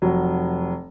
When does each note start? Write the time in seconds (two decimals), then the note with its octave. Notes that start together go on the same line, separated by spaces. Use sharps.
0.02 F1 F#3